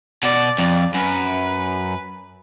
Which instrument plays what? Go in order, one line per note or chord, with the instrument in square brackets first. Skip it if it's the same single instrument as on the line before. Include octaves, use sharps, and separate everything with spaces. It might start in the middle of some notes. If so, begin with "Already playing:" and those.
[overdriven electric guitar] B2 [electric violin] D5
[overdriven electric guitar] F2 [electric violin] D5
[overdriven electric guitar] F#2 [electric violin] B4